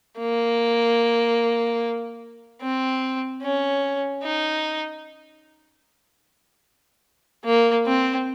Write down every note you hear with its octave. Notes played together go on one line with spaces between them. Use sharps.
A#3
C4
C#4
D#4
A#3
C4